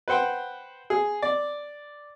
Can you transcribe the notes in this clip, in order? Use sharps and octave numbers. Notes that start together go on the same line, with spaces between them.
B4 C5 F#5 G5
G#4
D5